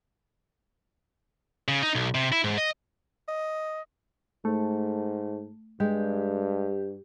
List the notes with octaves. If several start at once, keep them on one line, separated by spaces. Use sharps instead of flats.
C#3
D#4
B1
C3
E4
G#2
D#5
D#5
G#2 A3
G2 G#3 G4